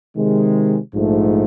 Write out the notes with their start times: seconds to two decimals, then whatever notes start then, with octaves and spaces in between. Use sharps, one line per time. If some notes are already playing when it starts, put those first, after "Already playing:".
0.16 C3 D#3 G#3
0.95 A#1 G#2 F3 A3